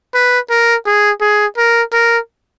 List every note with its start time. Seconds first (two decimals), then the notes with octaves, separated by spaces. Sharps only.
0.14 B4
0.50 A#4
0.86 G#4
1.21 G#4
1.57 A#4
1.93 A#4